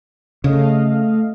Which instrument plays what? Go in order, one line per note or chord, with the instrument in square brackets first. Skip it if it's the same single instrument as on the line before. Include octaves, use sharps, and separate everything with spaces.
[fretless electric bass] C#3 [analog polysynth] A3 D#5 F5